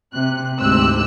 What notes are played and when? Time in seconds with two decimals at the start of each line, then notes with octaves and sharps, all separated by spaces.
0.14 C3 F#6
0.59 D2 G#2 C4 G4 E6 F#6